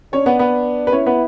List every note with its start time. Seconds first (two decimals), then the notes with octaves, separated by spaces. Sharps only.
0.13 C#4 D4 C#5
0.26 B3 B4
0.39 B3 B4
0.87 B4
0.92 C#4 E4 C#5
1.06 B3 B4